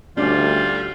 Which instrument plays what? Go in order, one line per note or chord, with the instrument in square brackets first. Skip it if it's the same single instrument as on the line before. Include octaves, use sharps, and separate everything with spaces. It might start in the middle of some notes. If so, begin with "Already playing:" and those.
[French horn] D2 [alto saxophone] G3 [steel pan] C#4 D4 D5 [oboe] F4